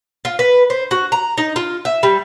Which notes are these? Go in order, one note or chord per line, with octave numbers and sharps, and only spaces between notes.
F4
B4
C5
F#4
A#5
D#4
F4
E5
G3